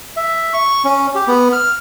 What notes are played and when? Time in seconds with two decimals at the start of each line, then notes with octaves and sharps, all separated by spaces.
0.17 E5
0.53 C#6
0.85 C#4
1.15 G4
1.28 B3
1.53 F6